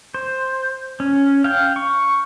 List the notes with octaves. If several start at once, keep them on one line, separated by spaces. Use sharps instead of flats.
C5
C#4
F5 G5
C#6